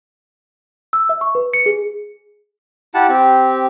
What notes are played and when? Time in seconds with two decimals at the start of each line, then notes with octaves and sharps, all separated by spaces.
0.93 E6
1.09 E5
1.21 C#6
1.35 B4
1.53 C#7
1.66 G#4
2.94 E4 G4 F#5 A5
3.09 C4 G4